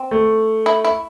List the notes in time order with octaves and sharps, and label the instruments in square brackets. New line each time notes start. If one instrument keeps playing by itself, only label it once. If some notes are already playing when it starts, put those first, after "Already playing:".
Already playing: [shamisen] C4
[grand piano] A3
[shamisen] E4
E4